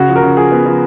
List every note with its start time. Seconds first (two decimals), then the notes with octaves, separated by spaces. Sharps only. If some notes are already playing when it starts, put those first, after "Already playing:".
Already playing: C#3 F#4
0.09 F3
0.16 A#4
0.22 C#3
0.37 F3 G#4
0.52 B3
0.66 F3